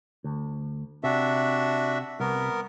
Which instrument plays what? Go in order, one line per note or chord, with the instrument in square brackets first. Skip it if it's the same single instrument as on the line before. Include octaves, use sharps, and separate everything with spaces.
[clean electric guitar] D2
[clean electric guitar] C3 [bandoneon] D4 F#4 E5
[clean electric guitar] C2 [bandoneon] B3 A#4